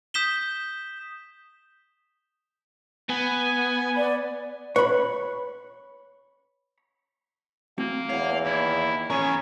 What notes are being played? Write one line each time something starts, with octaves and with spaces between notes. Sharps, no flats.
D#6 G6 B6 E7 G7
B3 G#5
D5
B4 C#5 B5
A3 A#3 C4 F#4
E2 C#5 F5 F#5
D#2 E4
A#2 B3 C#4 G#4 A#4 A#5 C#6